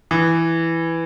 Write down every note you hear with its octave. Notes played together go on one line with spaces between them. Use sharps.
E3